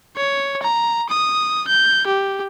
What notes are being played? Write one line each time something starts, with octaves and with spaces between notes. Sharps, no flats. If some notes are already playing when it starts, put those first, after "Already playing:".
C#5
A#5
D#6
G6
G4